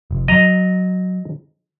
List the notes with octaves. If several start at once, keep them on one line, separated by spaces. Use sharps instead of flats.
F1
F#3 D#5 A#5